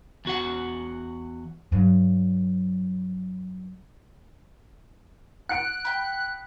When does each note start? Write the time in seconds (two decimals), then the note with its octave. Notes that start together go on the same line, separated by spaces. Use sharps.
0.25 E2 F#4 F#5
1.72 G2 F#3
5.49 F#5 F#6 C#7 D7
5.85 G5 B5